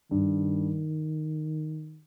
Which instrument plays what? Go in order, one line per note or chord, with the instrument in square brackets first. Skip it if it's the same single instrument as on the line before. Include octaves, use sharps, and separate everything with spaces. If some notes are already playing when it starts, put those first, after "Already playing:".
[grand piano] G2 [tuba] D#3